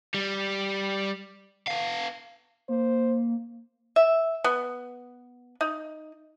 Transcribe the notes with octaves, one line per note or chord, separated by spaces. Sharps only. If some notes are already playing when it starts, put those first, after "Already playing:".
G3
B3 F5
A#3 C5
E5
B3
D#4